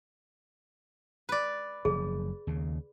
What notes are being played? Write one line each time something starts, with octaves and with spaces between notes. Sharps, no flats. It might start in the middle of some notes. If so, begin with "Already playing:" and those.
B4 D5
F#1 F3 G#4
D#2 C#3